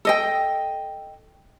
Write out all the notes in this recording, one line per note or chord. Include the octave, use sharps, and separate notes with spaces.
A4 D#5 G5